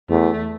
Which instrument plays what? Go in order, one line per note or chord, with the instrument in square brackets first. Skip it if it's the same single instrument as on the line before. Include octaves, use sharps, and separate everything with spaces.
[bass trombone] E2 [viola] A3